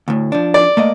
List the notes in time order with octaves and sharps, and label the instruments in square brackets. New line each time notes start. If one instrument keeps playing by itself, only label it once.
[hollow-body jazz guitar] D2 A2
F3 D4
[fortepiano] D5
[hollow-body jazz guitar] A3 A#3 D#5